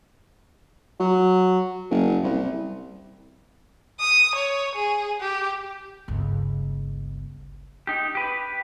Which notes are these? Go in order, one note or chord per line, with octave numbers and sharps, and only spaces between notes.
F#3
F#1
C2
D#6
C#5
G#4
G4
G1 C#2
D#4 G4
G4 B4